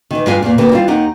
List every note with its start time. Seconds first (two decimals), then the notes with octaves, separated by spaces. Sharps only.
0.11 D#3 E3
0.26 G2 G#3 D4 F4 G#5
0.42 E2 A#2
0.58 D2 D3 A#3 G4 B4
0.72 E3 G3 E4 F4
0.88 D#2 D#4 G4 F#5